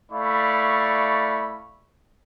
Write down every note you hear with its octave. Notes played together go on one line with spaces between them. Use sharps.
A3 E4 D5 F5 B5 C#6